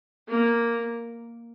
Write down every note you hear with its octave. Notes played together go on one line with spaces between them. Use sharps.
A#3